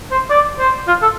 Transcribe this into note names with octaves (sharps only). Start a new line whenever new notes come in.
C5
D5
C5
F4
A4